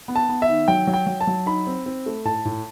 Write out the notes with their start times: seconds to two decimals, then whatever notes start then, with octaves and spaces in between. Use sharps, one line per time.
0.08 B3
0.16 A5
0.29 B3
0.42 E5
0.48 D#3
0.68 F#3 G5
0.87 F#3
0.93 G5
1.07 F#3
1.21 A5
1.27 F#3
1.46 D#4 B5
1.67 C4
1.86 C4
2.06 A3
2.25 A2 A5
2.45 A2